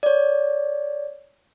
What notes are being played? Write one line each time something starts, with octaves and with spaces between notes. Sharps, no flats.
C#5 D5